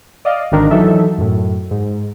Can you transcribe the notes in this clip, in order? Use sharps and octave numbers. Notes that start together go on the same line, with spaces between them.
D5 D#5 F5
G#1 D3 D#3 D4 A#4
E3 F#3 D#4 A4 E5
F#2 A2
G#2